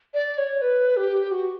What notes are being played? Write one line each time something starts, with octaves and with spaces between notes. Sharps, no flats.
D5
C#5
B4
G4
F#4